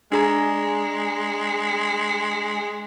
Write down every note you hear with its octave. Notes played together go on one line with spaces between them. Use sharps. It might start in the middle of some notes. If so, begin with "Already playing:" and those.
G#3 D4 G#4 A#5